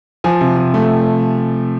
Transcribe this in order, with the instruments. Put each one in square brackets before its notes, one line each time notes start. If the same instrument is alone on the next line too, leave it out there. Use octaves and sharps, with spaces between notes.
[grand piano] F3 G#5
C3
F3
A3